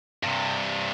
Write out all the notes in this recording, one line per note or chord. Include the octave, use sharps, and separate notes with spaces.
G2 C3